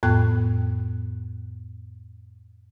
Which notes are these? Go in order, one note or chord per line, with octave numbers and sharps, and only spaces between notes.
F2 A2 B3 G5 F#6